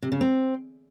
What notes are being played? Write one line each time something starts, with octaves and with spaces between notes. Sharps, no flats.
C3
C#3
C4